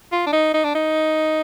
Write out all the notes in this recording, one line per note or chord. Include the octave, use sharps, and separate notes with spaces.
F4
D4
D#4
D#4
D4
D#4